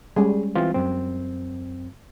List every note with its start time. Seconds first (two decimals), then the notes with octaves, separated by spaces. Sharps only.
0.16 G3 G#3 C#4 G#4
0.55 E3 C4 F4
0.74 F#2 C4